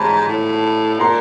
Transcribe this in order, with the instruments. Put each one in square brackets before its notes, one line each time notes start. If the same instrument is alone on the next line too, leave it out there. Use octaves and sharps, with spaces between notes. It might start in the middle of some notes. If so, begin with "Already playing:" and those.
Already playing: [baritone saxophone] G#2 [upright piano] A5 B5
[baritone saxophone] A2
[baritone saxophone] A#2 [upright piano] A#5 C6